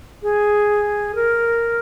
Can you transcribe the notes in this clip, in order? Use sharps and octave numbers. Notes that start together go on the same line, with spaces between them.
G#4
A#4